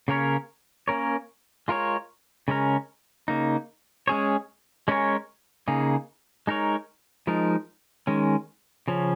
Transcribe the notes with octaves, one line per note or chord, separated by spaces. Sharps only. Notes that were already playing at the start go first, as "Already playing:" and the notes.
C#3 A#3 C#4 A#4 C#5
A#3 C#4 A#4 C#5
G#3 F4 A#4 C#5
C#3 G#3 C#4 A#4
C#3 A#3 D#4
G#3 C#4 G#4 C#5
G#3 C#4 A#4 C#5
C#3 A#3 D#4 G#4
G#3 D#4 A#4 C#5
F3 G#3 D#4 A#4
D#3 G#3 C#4
C#3 F3 C#4